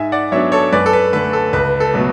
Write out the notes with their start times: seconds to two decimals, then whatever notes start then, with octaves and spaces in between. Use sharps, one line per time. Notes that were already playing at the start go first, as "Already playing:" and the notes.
Already playing: G#2 E5 G#5
0.12 D5 F#5
0.32 F#3 B3 D4 C#5 E5
0.52 A4 C#5
0.72 F#2 B4 D5
0.86 A4
0.93 B4
1.13 D3 A3 B4
1.33 A4
1.53 C#2 B4
1.80 A4
1.94 B2 F#3 A3